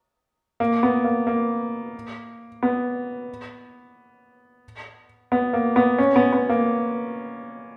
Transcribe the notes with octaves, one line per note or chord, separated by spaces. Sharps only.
A#3
B3
A#3
A#3
B3
B3
A#3
B3
C#4
B3
B3
A#3